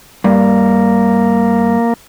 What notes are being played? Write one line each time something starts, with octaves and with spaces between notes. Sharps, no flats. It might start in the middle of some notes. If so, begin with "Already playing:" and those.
G2 A#3